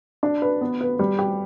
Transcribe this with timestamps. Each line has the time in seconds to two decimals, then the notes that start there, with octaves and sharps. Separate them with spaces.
0.23 D4
0.42 B4
0.61 B3
0.81 B4
0.99 G3
1.19 G4